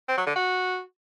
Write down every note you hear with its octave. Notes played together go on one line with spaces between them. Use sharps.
C4
F#3
D3
F#4